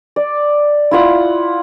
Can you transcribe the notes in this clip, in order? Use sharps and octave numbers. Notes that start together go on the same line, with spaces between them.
D5
E4 F4 F#5